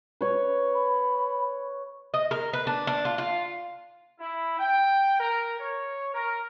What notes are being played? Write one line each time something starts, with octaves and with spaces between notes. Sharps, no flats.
B4 C#5
B5
D#5
A#4
B4
D4
D4
F4
F4
E4
G5
A#4
C#5
A#4